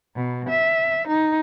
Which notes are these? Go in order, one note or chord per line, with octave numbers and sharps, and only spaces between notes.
B2
E5
D#4